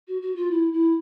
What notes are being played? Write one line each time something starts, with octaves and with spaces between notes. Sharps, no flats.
F#4
F#4
F4
E4
E4